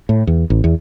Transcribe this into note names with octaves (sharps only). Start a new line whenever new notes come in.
A2
E2
A1
E2